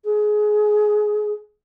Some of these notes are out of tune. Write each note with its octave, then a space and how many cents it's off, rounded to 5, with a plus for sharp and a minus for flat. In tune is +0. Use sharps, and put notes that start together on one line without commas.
G#4 +20